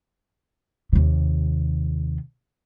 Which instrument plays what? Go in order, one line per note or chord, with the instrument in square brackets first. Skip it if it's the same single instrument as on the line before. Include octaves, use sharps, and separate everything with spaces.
[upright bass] D#2 C3